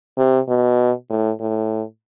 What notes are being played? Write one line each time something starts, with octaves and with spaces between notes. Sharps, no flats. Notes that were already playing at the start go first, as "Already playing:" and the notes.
C3
B2
A2
A2